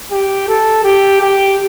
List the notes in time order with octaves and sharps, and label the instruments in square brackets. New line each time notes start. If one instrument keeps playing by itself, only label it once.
[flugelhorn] G4
A4
G4
G4